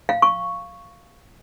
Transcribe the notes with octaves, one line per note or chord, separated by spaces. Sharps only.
F5
C#6